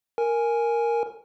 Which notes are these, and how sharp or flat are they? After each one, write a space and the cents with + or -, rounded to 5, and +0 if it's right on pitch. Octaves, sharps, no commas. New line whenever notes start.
A#4 +0 G#5 +0